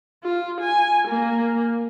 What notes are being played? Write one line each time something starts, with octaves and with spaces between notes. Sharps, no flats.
F4
G#5
A#3